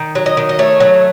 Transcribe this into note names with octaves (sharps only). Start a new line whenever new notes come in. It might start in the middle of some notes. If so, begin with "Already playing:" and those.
Already playing: D#3
F#3
D#5
D#3
D#5
A3 C#5
F#3